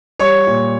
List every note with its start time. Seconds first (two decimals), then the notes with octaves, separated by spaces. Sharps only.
0.19 G3 C#5 C#6
0.47 A#2